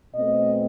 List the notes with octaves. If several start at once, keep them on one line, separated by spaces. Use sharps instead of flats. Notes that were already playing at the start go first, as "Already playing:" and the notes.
B2 A3 C4 D#5